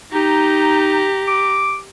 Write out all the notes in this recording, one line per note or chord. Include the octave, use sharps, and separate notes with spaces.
D#4 G4 A#5
D6